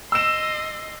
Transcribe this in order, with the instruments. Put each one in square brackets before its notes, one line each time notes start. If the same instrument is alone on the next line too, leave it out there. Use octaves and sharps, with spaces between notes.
[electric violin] D#5 C6 [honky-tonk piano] E6 E7